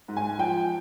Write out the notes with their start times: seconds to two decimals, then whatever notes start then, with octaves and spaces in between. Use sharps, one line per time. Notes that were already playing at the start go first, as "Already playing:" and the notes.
0.08 G#2
0.17 G#5
0.39 F3 G5